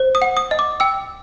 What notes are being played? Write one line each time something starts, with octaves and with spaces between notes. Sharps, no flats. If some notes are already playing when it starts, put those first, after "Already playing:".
Already playing: C5
D#6
F#5
D#6
D#5
D6
G5 E6